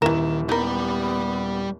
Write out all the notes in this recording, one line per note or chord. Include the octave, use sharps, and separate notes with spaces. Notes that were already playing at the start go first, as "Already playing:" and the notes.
D#1 D#3 E3 E4 A#4 E7
G3 B3 D#4 A#4 B5